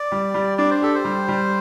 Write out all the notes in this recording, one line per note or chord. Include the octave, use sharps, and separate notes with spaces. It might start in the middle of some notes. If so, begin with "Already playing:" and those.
Already playing: D5
G3
G3
D4 D5
C5
G4 A4
C5
G3
G3